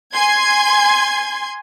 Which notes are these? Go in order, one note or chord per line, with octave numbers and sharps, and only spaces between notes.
G#5 C6 G#6